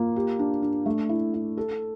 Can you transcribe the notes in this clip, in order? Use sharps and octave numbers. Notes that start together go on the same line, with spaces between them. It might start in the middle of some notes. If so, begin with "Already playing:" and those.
Already playing: A#3 F4
G4
D4
D4
A3
E4
E4
A4